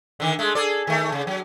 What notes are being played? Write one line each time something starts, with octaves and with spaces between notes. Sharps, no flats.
D3 D#3
G#3 A3
G#4 A4 D5
D#3 A3
C#3
F#3